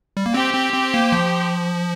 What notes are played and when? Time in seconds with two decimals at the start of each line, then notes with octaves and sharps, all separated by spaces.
0.17 G3
0.26 A#3
0.34 C4 G4 C5 G5
0.54 C4
0.73 C4
0.94 A#3
1.12 F3